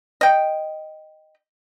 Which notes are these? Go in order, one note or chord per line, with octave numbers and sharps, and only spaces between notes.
D#5 G5